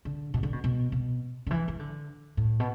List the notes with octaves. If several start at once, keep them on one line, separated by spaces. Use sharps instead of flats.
D3
B2
D3
B2
B2
B2
D3
E3
E3
D3
A2
B2